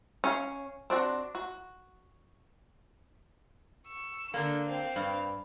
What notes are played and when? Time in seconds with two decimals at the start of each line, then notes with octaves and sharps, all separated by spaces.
0.24 C#4 C#5 F5
0.90 C4 D4 F#4
1.35 F#4
3.87 C#6 E6
4.34 D3 A#3 D4 A4
4.66 C4 F5
4.96 G2